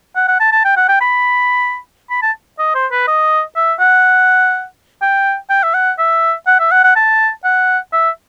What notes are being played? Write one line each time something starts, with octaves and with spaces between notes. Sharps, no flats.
F#5
F#5
A5
A5
G5
F#5
G5
B5
B5
A5
D#5
C5
B4
D#5
E5
F#5
G5
G5
E5
F#5
E5
F#5
E5
F#5
F#5
A5
F#5
E5